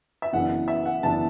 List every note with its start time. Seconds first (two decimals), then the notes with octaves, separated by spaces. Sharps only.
0.22 E5
0.33 F#1 F#2 E3 B3 D4 F#5
0.68 E5
0.85 F#5
1.03 F#1 E3 B3 D4 A5